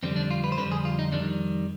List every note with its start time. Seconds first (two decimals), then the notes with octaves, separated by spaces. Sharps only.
0.03 F2 D3 G3 C4
0.16 D4
0.31 F4
0.44 B4
0.52 C5
0.58 F2 D3 G3 B4
0.71 G#4
0.85 F4
0.99 D#4
1.12 F2 D#3 G3 D4